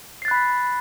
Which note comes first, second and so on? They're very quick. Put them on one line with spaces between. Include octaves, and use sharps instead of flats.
C7 A6 F#6 B5 B6